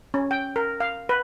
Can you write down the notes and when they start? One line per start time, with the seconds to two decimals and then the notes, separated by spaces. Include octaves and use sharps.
0.14 C#4
0.31 G5
0.56 A#4
0.80 F5
1.09 B4